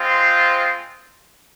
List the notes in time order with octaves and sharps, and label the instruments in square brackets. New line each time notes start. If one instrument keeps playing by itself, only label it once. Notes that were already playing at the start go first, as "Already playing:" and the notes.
Already playing: [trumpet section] G#3 C4 F4 C5